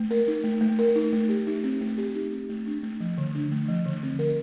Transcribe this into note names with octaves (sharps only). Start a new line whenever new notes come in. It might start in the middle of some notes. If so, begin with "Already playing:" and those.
Already playing: A3
A#4
D#4
A3
A3
A#4
D#4
A3
G4
D#4
C4
A3
G4
D#4
C4
A3
D4
A3
F3
D3
D4
A3
F3
D3
C4
A#4